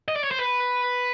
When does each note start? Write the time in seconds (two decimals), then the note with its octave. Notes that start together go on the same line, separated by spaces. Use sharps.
0.08 D#5
0.16 D5
0.24 C#5
0.31 C5
0.39 B4